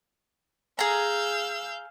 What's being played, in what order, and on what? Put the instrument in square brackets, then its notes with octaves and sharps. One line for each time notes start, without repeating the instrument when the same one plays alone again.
[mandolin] G#4 A#5 [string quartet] F5 E6 G6